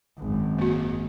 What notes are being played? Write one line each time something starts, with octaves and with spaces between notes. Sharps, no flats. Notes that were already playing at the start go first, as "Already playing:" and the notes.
G#1 F#2
A#3 F#4